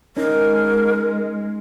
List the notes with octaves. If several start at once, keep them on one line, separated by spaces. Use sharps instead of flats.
G#3 C#4 D#4 A#4